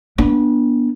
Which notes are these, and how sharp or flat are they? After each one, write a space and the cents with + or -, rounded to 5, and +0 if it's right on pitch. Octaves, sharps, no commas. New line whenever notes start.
B3 -30 D4 +0